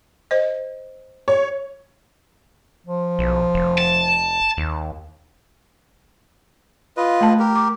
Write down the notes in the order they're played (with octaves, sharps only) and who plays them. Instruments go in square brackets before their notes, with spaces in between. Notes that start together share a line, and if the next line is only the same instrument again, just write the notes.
[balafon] C5 D#5
[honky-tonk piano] C#5
[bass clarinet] F3
[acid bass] B1
F1
[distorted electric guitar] A5
[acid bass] D#2
[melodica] F4 B4 D#5
[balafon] A3 A5
[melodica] G4 A#4
[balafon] D6